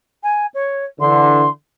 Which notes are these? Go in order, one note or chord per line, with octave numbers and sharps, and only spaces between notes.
G#5
C#5
D3 E3 C6